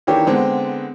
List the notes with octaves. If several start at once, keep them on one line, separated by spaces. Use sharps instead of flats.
D#3 E3 A#3 D4 G4 C#5
D3 G#3 B3 C4